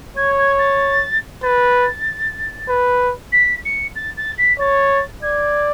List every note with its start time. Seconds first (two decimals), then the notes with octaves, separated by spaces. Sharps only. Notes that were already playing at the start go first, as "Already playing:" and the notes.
0.16 C#5 G#6
0.38 G#6
0.58 A6
1.42 B4 A6
2.69 B4
3.32 B6
3.65 C#7
3.95 A6
4.17 A6
4.38 B6
4.59 C#5 A6
5.22 D5 G#6